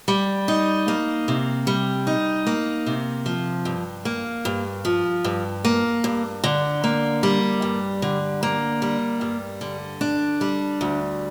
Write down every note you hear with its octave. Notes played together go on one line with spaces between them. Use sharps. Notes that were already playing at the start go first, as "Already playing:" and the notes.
G3
D#4
A#3
C3
G3
D#4
A#3
C3
F3
G2
A#3
G2
F3
G2
A#3
G2
D3
A#3
G3
G2
D3
A#3
G3
G2
D3
D4
G3
D2